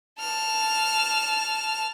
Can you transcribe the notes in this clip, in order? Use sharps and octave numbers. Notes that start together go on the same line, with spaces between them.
A5 F6